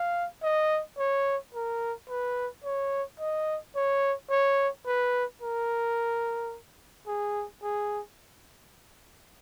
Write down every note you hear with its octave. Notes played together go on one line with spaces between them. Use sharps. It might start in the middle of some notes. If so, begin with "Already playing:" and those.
Already playing: F5
D#5
C#5
A#4
B4
C#5
D#5
C#5
C#5
B4
A#4
G#4
G#4